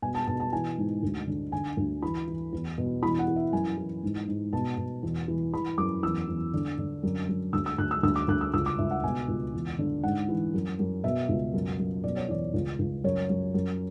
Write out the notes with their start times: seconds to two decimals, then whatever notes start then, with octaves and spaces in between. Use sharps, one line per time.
0.02 B2 G#5
0.15 A5
0.27 B2 A5
0.40 A5
0.52 E3 G#5
0.78 G#2
1.03 D2
1.27 D3
1.52 D3 G#5
1.77 D2
2.02 E3 B5
2.28 E3
2.53 E2
2.78 B2
3.03 E3 B5
3.19 F#5
3.28 E3
3.36 E5
3.53 F#2 G#5
3.78 E3
4.03 G#2
4.28 G#2
4.53 B2 A5
4.78 B2
5.03 E2
5.28 E3
5.53 E3 B5
5.78 F#2 D6
6.03 E2 E6
6.28 E2
6.53 D3
6.78 D3
7.03 F#2
7.28 F#2
7.53 D2 E6
7.66 E6
7.78 D2 F#6
7.91 E6
8.03 D2 E6
8.16 D6
8.28 D2 F#6
8.41 E6
8.54 C#2 E6
8.66 D6
8.79 C#2 E5
8.91 F#5
9.04 B2 G#5
9.28 C#2
9.53 E2
9.79 D3
10.03 G#2 F#5
10.29 E3
10.54 F#2
10.79 F#2
11.04 B2 E5
11.29 C#2
11.53 F#2
11.79 F#2
12.04 B2 D5
12.17 C#5
12.29 E2 D5
12.54 C#2
12.79 C#2
13.04 F#2 C#5
13.29 F#2
13.54 F#2